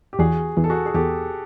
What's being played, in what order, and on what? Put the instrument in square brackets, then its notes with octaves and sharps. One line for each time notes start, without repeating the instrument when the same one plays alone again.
[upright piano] G4
[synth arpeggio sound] E2 [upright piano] F#4 G#4
[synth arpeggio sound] E2
[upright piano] A4
F#4 G#4
G#4
[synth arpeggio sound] E2 [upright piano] G4 A4